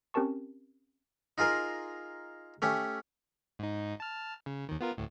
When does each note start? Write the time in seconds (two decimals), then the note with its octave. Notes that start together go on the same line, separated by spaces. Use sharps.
0.14 C4 C#4 G4 A#4 A5 C#6
1.38 D#4 F4 G#4 A#4 C6
2.62 A3 C#4 G4
3.59 G#2 D#4
4.00 A5 F6
4.46 C#3
4.69 D#2 D#3
4.80 B3 F4 A#4
4.98 D2 A2